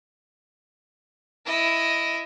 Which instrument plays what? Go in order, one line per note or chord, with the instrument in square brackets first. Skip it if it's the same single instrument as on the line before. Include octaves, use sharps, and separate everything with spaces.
[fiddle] E4 D#5